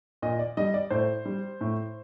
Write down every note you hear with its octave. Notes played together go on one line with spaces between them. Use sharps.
A#2 D#5
D5
G3 D#5
D5
A2 C5
G3
A2